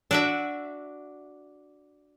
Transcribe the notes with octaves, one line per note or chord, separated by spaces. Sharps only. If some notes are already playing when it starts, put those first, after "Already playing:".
D4 F#4 E5